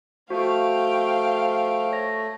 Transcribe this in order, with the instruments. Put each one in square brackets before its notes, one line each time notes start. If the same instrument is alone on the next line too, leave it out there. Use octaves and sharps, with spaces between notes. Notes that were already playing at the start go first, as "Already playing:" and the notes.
[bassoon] F3 [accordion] A3 [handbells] F#4 [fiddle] F5 G5
[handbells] C#5 A#6